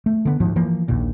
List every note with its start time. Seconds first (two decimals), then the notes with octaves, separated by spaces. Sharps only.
0.06 A3
0.25 D3 B3
0.40 D2 G#2 F3
0.56 E3 F3 A#3
0.88 A#1 D#2 A#2